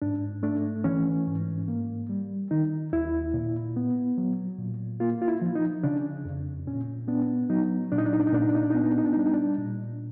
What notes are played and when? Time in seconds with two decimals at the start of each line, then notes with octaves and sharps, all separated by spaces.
0.02 G#2 D4
0.43 A3 D4
0.84 E3 C#4
1.27 G#2
1.68 A#3
2.09 G3
2.51 D#3 D#4
2.93 D#2 E4
3.34 A#2
3.76 B3
4.18 F#3
4.58 A#2
5.00 A#3 F4
5.22 F4
5.28 E4
5.42 F3
5.55 D#4
5.83 C#3 D4
6.25 F2
6.67 A#2 C#4
7.08 B3 D4
7.50 F#3 D#4
7.92 A#2 D4
7.98 D#4
8.06 D4
8.13 D#4
8.20 D4
8.27 D#4
8.32 A#2 D4
8.42 D#4
8.49 D4
8.55 D#4
8.63 D4
8.70 D#4
8.75 B3 D4
8.83 D#4
8.91 D4
8.98 D#4
9.06 D4
9.13 D#4
9.16 G3 D4
9.26 D#4
9.33 D4
9.58 A#2